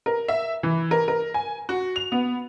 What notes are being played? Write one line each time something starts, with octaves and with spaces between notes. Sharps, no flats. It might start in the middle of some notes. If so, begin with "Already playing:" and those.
A#4
E5
E3
A#4
A#4
G#5
F#4
F7
B3